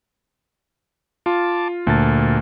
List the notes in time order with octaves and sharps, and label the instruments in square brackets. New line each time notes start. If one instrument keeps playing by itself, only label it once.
[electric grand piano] F4 [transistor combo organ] A5 D6
[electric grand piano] D2 A5 A6 [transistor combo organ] A#2